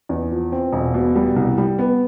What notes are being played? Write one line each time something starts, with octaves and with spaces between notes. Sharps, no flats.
E2
F3
C4
E1
B2
G3
C2
G3
B3